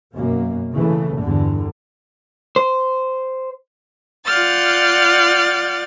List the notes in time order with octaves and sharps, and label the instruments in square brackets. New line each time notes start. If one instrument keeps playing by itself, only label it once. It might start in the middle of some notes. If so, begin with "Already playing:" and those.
[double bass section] F#2 B2 A#3
C#3 E3 A3
E2 G2 D3
[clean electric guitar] C5
[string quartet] F4 D5 F#5 F6 G6 A6